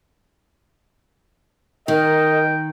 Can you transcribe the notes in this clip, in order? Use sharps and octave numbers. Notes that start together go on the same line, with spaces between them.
D#3 A#4 D#5 G5